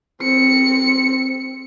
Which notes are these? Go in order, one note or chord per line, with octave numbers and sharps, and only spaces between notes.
C4 C#7